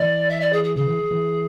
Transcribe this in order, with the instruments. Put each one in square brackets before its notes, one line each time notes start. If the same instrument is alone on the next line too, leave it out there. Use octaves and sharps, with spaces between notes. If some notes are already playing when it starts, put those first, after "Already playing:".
Already playing: [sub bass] E3 [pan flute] D5
[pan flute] E5
D5
G#4
G#4
[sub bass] C#3 [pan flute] G#4
[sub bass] E3
E3